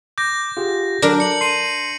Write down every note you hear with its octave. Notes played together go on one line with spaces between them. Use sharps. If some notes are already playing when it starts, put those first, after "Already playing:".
D6 G6 A#6
F4 G4 G#4
F#3 D4 A#4
C#7 F#7
C6 C7 D#7